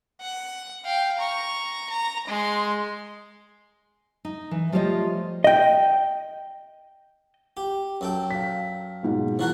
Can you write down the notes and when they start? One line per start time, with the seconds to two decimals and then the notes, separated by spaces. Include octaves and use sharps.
0.21 F#5
0.84 F5 G5
1.18 A#5 C#6
1.89 A#5
2.28 G#3 C6
4.25 D#4
4.51 E3
4.72 F3 G3 A3 F4 C#5 D#5
5.44 D#5 G5
7.57 G4
8.01 F#2 A4 G5
8.31 F5 B6
9.03 G#2 B2
9.39 E3 F3 F#4 A#4 F#6